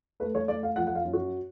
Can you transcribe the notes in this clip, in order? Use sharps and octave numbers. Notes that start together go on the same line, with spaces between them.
A3 B4
C#5
A3 D5
F5
F3 F#5
F#5
F5
F#2
F#4